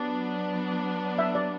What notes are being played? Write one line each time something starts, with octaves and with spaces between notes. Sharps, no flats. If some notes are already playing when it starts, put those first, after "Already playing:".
Already playing: F#3 B3 D4 D5
E5
D5